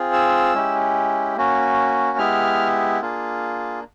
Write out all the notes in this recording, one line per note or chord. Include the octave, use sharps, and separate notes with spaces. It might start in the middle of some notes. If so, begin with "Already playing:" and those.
Already playing: C4 F4 G#4
E6
G#3 C#4 E4 G4
A#3 C#4 F#4
G#3 B3 E4 G4 F6
A#3 D4 F4 G#4